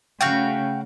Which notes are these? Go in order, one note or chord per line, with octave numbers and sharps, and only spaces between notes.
C#3 A3 F#4 F5 G5